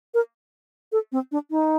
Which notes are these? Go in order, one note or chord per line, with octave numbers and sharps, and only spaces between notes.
A#4
A4
C4
D4
D#4